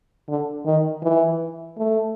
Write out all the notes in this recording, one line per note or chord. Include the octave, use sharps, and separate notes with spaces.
D3
D#3
E3
A3